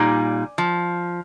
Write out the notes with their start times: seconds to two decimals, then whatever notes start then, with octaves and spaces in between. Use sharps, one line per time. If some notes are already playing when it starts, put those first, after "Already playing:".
Already playing: A#2 G3 D#4 G#5
0.58 F3